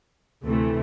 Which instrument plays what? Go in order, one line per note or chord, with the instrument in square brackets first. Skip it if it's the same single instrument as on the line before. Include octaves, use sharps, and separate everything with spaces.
[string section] D2 C3 E3 A3